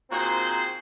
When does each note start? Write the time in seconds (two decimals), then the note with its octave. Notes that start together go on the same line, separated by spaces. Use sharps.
0.10 A#2 C4 D#4 F#4 G#4 C5